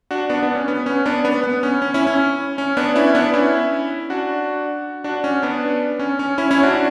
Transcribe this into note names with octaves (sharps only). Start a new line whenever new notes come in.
D4 F#4
B3 D4
B3 D4
C#4
B3
C#4
B3 D4
B3
B3
C#4
C#4
C#4 E4
C#4
C#4
B3 D4
C#4 E4
B3 D4
C#4 E4
D4 F#4
D4 F#4
C#4
B3 D4
C#4
C#4
C#4 E4
C#4 E4
D4 F#4